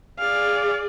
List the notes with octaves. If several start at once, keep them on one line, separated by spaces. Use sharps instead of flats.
G#4 D5 F5